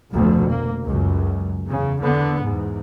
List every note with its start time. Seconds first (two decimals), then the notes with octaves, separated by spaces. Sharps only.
0.12 F1 D2 B2 F3
0.48 A#3
0.84 C#2 F#2
1.69 E2 C#3
2.01 E2 D3 B3
2.44 E2 G#2